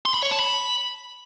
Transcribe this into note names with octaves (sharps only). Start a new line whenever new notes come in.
C6
B5
C#5
A5
B5